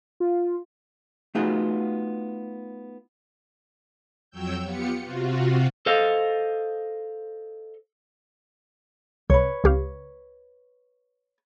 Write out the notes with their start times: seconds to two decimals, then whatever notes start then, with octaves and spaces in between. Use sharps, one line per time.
0.20 F4
1.35 A3 B3 D#4 F4 F#4 G#4
4.30 F2 F#3 C#5 G5 E6 G6
4.63 B3 F4 G4 C#7
5.01 C3 F4 F#4
5.86 A4 C5 D#5 F5
9.30 C2 B4 C#5
9.64 C#2 G4 F5